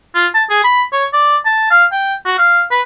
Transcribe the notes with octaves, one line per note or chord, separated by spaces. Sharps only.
F4
A5
G#4
B5
C#5
D5
A5
F5
G5
F#4
F5
B4